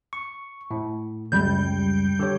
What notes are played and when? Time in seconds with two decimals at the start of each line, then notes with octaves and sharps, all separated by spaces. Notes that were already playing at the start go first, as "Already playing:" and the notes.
0.13 C#6
0.71 A2
1.32 C#2 F#2 G3 G6
2.19 D3 G4 C#5